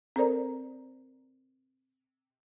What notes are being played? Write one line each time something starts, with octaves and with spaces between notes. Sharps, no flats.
C4 A4 A#4 C5 D5 A#5